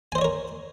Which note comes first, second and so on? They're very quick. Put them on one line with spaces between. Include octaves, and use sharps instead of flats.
G#5 C5 D#5 C#5 A#4